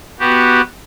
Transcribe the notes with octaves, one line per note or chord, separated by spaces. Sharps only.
B3 F#4 G4